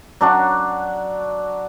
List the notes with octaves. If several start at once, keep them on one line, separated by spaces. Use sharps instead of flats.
F#3 D4 F#4